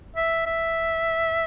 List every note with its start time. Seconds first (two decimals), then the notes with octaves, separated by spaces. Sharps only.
0.16 E5
0.46 E5